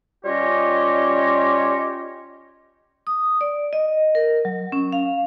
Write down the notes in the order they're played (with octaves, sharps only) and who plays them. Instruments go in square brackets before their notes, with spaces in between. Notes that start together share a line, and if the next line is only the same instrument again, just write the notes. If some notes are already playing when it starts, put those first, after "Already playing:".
[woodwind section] G3 C#4 F4 G4 C#5 D#5
[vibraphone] D#6
D5
D#5
A#4
F#3
C#4
F5